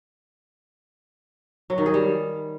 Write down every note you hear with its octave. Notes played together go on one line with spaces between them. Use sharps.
F#3
D#3
G#4
G3